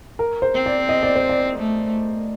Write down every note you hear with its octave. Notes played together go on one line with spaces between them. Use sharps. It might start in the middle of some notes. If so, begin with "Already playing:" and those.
A#4
C5
C4
D5
D#5
D5
C5
D5
A3